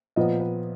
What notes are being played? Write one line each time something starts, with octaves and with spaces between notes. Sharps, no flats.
A#2 F3 B3 D#5
B4